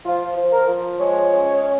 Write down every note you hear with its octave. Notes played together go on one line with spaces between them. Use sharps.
F3 F4
F3
A#4
F3
G#3 C#5
C#4
C#4